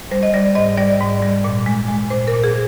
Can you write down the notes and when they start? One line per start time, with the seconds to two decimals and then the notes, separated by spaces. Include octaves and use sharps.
0.11 G3 C5
0.23 D#5
0.33 G3 D5
0.55 G#2 D#5
0.77 G3 D5
1.00 G#2
1.22 G3
1.44 A#2
1.66 G#3
1.88 G#3
2.10 A#2 C5
2.27 A#4
2.33 A#2
2.44 G#4